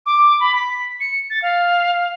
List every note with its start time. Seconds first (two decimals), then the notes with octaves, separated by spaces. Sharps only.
0.06 D6
0.40 B5
0.55 B6
1.00 C#7
1.30 A6
1.42 F5